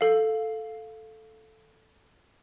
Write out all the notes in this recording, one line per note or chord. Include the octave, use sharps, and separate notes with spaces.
A4 F5